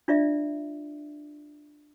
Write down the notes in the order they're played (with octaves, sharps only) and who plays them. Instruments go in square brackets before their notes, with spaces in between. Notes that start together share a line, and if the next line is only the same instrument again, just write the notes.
[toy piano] D4 F4 D5 E5